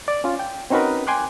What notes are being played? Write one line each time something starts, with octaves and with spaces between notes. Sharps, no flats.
D5
C#4 F4
G5
C4 C#4 D#4 F#4 A#4 B4
G5 G#5 C6 D6 F#6